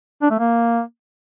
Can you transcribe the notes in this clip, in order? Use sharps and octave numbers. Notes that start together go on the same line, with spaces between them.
D4
A3
A#3